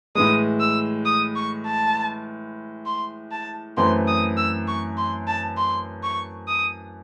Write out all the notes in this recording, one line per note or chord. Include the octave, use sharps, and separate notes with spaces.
A2 E3 G#3 D#6
E6
D#6
C#6
A5
C6
A5
F#2 E3 A3 C4 C6
D#6
E6
C#6
C6
A5
C6
C#6
D#6